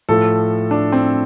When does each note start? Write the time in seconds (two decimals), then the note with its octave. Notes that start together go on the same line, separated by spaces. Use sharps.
0.09 A2 F3 A4
0.71 D4
0.92 C4